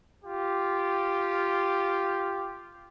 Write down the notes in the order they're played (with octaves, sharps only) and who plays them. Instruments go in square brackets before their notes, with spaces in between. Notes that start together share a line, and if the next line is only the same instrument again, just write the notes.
[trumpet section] F4 G4